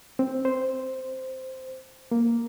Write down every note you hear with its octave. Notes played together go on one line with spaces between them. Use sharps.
C4
C5
A#3